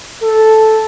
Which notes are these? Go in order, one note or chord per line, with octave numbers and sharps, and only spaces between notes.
A4